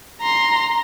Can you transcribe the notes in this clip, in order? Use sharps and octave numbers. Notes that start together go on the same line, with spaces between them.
A#5 C6